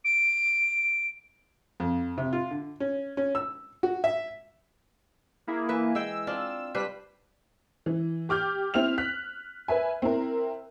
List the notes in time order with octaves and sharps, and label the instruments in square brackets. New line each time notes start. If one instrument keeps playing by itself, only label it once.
[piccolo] D7
[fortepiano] F2
C3
F4
D3
C#4
C#4
E6
F#4
E5
[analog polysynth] A#3 E4 G#4
[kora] E3 B4 E5
[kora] G#3 G5 [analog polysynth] E6
[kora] C4 D4 F4
[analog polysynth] G3 B6 [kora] D4 B4 C5
[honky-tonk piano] E3
G4 D6 F6 G6
C4 E4 F6 F7
F#6 B6
B4 E5 G#5
C4 E4 A#4